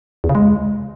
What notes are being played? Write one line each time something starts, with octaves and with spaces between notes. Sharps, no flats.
E2
C#3
G#3